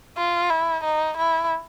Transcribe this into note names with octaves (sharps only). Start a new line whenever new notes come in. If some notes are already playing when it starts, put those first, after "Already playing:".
F4
E4
D#4
E4